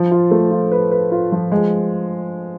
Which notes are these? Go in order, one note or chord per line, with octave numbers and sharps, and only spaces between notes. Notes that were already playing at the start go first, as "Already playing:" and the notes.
Already playing: F3
F4
A3
F4
B4
B4
F4
F3
G#3